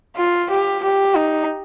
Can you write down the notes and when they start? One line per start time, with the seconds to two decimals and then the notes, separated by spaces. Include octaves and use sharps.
0.16 F4
0.50 G4
0.83 G4
1.15 D#4